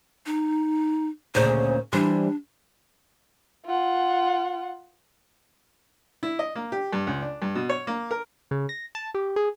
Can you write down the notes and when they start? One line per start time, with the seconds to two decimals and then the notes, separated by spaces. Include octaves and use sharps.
0.26 D#4
1.35 D2 A#2 C#3 C5
1.93 E3 G3 D4 C5
3.66 F4 F#5
6.23 E4
6.39 D#5
6.55 A#3
6.72 G4
6.93 G2
7.07 C#2
7.22 D4
7.42 G2
7.55 B2
7.69 C#5
7.87 A#3
8.11 A#4
8.51 C#3
8.69 A#6
8.95 A5
9.14 G4
9.36 G#4